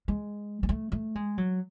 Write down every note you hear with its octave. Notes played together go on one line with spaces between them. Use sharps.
G#3
G#3
A3
A3
G#3
F#3